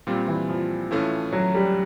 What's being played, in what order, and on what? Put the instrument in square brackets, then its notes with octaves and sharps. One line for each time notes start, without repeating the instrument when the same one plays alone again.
[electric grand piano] A#2 G3 C4 F4
[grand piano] E3
F3
[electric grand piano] A2 E3 A3 C#4 F4
[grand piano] F#3
G3